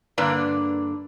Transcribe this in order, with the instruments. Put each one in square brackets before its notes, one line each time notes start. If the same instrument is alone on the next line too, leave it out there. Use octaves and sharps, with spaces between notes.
[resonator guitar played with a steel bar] G2 D3 A#3 D4 B4 D5